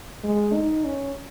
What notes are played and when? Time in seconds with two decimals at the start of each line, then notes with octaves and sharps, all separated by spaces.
0.24 G#3
0.54 D#4
0.85 C#4